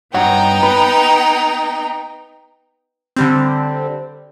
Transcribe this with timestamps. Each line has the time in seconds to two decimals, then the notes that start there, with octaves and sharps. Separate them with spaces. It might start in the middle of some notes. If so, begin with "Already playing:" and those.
0.14 G2 B3 D#4 C#5 F#5 G5
0.63 B4
3.16 D3 G3 C4